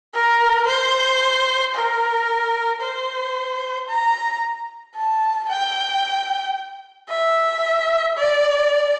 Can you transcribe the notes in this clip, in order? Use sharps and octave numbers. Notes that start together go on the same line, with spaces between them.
A#4
C5
A#4
C5
A#5
A5
G5
E5
D5